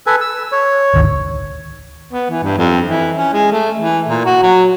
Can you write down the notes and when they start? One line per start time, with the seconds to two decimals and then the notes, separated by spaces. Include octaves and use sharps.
0.07 A4 B4 G#5
0.21 E6
0.52 C#5
0.94 G#1 D2 D#3
2.13 B3
2.30 E3
2.43 G2
2.58 F2
2.87 E3
3.17 C#4
3.33 G#3
3.52 A3
3.80 E3
4.09 A#2
4.25 F#4
4.43 F#3